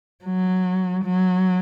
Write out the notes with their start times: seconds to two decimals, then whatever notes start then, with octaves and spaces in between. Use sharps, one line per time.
0.25 F#3
1.05 F#3